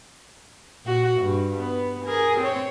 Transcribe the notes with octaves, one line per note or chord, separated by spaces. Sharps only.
A#2 F#4
G2
B3
G#4 A#4
C4 C#5